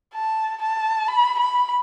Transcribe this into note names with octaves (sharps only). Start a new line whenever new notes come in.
A5
A5
B5
B5